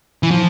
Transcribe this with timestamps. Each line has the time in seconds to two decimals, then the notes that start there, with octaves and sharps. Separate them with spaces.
0.23 E3
0.31 F3